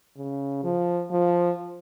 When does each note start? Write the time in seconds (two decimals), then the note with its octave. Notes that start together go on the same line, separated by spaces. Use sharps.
0.17 C#3
0.63 F3
1.11 F3